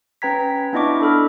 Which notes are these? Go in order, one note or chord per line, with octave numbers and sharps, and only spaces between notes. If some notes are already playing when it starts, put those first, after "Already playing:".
C#4 B4 G5 A#5 G#6 B6
B3 D4 E4 D#5 C#6 D6
D4 A4 B5 F6